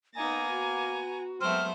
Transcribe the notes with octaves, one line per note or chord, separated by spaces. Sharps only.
A#3 B3 D#4 G#5 A#5 A6 A#6
F#4
F#3 G#3 A3 B3 C4 C5 F6